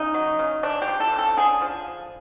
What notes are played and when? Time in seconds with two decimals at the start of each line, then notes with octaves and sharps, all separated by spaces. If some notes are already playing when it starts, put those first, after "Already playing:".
Already playing: C#3 D#4
0.14 F#3
0.39 C#3
0.63 C#3 D4
0.82 G4
0.88 F3
1.00 A4
1.13 C#3
1.19 A4
1.37 D3 G#4
1.61 F3